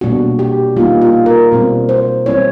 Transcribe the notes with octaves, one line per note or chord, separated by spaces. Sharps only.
B2 G3 A#3 D4 F#4
G4
G3 A#3 D#4 F4
F4
A#4
B2 G3 C4
C5
G3 C4 E4 C#5